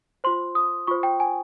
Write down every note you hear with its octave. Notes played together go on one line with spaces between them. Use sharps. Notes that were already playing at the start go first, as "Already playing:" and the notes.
F4 C5 C6
D#6
F4 C5 C#6
G5
G#5